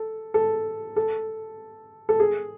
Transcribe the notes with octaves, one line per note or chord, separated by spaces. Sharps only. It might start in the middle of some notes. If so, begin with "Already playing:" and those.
Already playing: A4
A4
A4
A4
G#4